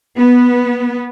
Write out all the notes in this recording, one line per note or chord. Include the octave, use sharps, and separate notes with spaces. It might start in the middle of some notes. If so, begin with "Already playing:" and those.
B3